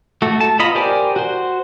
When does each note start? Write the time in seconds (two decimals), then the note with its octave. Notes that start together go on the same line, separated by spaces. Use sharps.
0.22 A3 F#4
0.40 A5
0.59 B3 F4 D#5 A#5 B5
0.75 G4 A#4 C5 D5 G#5
1.16 F#4 C5